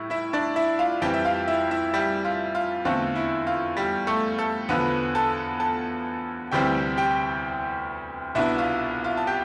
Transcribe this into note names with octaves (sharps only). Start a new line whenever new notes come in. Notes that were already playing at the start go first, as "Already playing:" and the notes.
Already playing: A2 G3 E4
E4 E5
D4 D5
E4 E5
F4 F5
F2 E3 G3 C4 G4 G5
E5
F4 F5
E4 E5
E4 E5
G3 G4
F4
F4
E2 D3 A3 C4 F4
E4
F4
G3 G4
A3 A4
A3 A4
E2 D3 F3 B3 B4
A4 A5
A4 A5
D2 C3 E3 G3 C4 G4 G5
G4 G5
C2 B2 B3 D4 E4 E5
F4 F5
F4 F5
A5
G4 G5